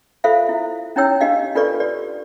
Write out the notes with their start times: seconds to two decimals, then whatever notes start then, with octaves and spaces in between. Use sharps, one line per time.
0.24 F4 A4 C5 E5 F5
0.49 E4
0.96 C#4 D#4 E4 C#5 G5 E6
1.21 D4 G4 D#5 F5
1.55 D4 F4 A4 B4 D5 C#6
1.80 G4 D5